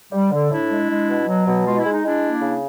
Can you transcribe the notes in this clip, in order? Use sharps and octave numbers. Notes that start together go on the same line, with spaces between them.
G3
D3
A2 D4 E4
G#3
G#3
B2
F#3
B2
G#3 F4
E4
G#3
D#4
G#3 D4 E4
A#3
C#3